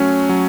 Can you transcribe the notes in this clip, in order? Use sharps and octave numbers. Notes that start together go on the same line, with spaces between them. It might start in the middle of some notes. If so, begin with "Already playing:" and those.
Already playing: F#3 A3 C#4
F#3